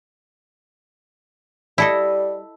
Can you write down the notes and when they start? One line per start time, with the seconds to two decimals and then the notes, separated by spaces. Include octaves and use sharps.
1.78 G3 E4 A4 D#5